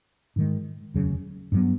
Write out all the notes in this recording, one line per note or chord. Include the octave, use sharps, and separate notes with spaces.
G#2 D#3 G#3
F1 D#2 C#3 F#3
G2 D3 F#3 B3